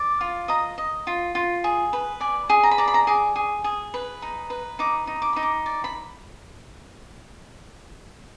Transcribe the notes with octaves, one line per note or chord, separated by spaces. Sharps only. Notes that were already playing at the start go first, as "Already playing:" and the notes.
Already playing: D5
F4
D#5 A#5
D#5
F4
F4
G#4
B4
D5 G#5
G#4
A#5
B5
D5 A#5
B5
A#5
G#4 D6
G#4
G#4
B4
D#4
B4
D#4 D6
D#4
D6
D#4 B5
D6
D5
B5